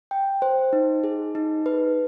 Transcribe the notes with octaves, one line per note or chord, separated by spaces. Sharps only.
G5
C5
D#4
G#4
D#4
B4